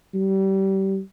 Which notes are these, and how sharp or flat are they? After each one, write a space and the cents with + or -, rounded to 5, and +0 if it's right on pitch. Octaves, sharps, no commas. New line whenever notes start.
G3 -25